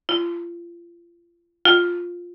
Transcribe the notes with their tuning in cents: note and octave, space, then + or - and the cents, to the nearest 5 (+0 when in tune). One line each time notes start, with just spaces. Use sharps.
F4 -30
F4 +5